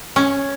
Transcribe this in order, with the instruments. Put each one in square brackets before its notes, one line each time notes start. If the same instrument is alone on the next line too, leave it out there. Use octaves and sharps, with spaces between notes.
[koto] C#4